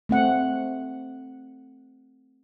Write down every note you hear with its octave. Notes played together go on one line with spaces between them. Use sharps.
A3 C4 F#5